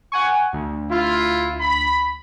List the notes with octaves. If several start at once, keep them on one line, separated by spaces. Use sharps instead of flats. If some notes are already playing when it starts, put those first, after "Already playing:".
F#5 G#5 C#6
D2
E4 F4
B5